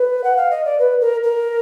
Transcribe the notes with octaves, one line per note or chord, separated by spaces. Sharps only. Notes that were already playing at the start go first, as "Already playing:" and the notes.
Already playing: B4
F#5
F5
D#5
D5
B4
A#4
A#4